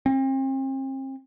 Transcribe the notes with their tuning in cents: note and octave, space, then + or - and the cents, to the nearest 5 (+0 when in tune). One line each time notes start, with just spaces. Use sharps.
C4 +40